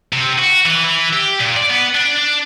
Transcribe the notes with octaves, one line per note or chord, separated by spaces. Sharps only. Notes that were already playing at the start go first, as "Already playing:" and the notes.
C3
F#4
E3
E3
G4
A#2
D5
B3
D4
D4